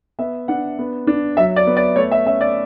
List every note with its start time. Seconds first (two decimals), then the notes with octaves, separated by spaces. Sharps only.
0.19 B3 E5
0.48 D4 F#5
0.79 B3
1.07 D4
1.37 F#3 E5
1.56 D5
1.67 B3
1.77 D5
1.96 A3 C#5
2.11 E5
2.26 C#4 E5
2.41 D5